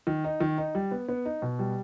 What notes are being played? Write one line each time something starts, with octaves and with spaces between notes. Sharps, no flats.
D#3
D#4
D#3
D#4
G3
B3
B3
D#4
B2
G3